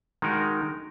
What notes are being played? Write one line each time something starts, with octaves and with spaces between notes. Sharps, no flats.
D#3 G#3 D#4 F#4 A#4